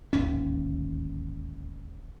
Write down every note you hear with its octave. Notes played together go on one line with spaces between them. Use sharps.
D1 G#1 D#2 C#4